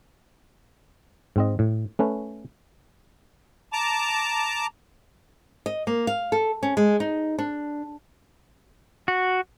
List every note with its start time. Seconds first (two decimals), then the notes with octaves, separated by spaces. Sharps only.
1.36 G#2 C4 D#5
1.59 A2
1.99 A3 C#4 B4
3.73 A5 A#5 D6
5.66 D#5
5.87 A#3
6.07 F5
6.32 A4
6.63 C#4
6.77 G#3
7.00 D#4
7.39 D4
9.08 F#4